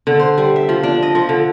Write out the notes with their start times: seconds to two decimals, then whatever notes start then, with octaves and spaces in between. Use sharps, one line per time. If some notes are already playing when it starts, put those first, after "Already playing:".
0.07 D3
0.19 C5
0.38 G3
0.56 E5
0.69 F3
0.83 D4
1.03 D#5
1.15 F3
1.29 D3